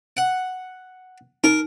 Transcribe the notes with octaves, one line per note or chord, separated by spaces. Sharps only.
F#5
D#4 A#4